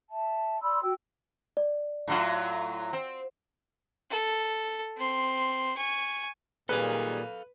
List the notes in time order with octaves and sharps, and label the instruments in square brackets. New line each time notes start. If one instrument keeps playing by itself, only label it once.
[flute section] E5 A5
D5 B5 C6 E6
F#4 G5 E6
[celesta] D5
[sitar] A2 F#3 F4
C4
[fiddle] A4
C4 C6
G#5 C#6
[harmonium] A#2 [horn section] D#3 G3 G#4 [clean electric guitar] A4 F5 [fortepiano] B4